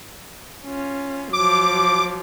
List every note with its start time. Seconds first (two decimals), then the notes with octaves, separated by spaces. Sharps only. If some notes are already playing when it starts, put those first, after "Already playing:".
0.65 C#4 F4
1.33 F3 F#3 D6